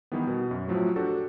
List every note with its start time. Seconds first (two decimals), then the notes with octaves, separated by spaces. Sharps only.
0.12 D#3 E3 G3 B3
0.27 B2
0.51 F#2
0.68 A2 F3 F#3 A3
0.96 D4 F#4 G4 A4